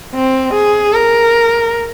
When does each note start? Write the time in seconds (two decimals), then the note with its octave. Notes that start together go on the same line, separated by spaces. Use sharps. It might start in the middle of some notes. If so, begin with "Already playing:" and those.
0.15 C4
0.53 G#4
0.93 A#4